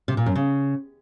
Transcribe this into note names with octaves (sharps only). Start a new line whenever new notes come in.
C3
A#2
F#2
C#3